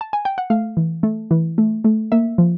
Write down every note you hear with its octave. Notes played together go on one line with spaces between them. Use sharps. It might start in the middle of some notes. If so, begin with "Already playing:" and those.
A5
G#5
G5
F#5
A3 F5
E3
A3
E3
A3
A3
A#3 E5
F3